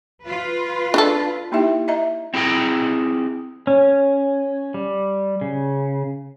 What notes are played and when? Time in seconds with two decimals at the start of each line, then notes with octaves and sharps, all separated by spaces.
0.23 F4 B4
0.94 D4 D#4 A4
1.52 A#3 D#4 E4 G4 E5 G5
1.88 D#5 E5 A#5
2.34 C4 E4 G#4 G5 A#5
3.67 C#4
4.74 G3
5.41 C#3